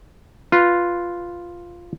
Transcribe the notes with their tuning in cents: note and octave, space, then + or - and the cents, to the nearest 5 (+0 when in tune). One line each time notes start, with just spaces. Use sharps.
F4 +0 B4 +0